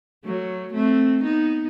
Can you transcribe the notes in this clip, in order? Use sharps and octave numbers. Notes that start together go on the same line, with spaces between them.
F#3 A3
A3 C4
B3 D#4